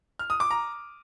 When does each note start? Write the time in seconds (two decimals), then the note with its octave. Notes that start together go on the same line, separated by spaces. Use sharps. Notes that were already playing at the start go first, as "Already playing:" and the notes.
0.19 F6
0.30 D#6
0.40 D6
0.51 A#5